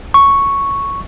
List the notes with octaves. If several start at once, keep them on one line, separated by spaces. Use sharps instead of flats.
C#6